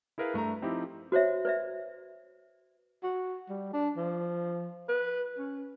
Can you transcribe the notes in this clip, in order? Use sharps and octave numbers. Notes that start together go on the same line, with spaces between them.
E4 G#4 A#4 B4 F5
G2 A3 E5 A#5
F3 C4 D#4 E4 G4
F#4 C5 C#5 E5
B4 D5 E5
F#4
G3
D4
F3
B4
C#4